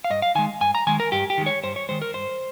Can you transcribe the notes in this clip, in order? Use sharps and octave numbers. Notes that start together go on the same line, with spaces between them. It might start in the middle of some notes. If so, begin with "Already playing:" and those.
F5
G2 D#5
F5
D#3 G#3 G#5
G2 G#5
A#5
D#3 G#3 G#5
A#4
G2 G4
G4
D#3 G#3
C#5
G2 C5
C#5
D#3 G#3 C5
A#4
G2 C5